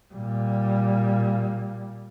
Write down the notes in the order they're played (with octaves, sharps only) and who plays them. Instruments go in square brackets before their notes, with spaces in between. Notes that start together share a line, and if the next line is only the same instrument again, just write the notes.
[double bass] A#2 G3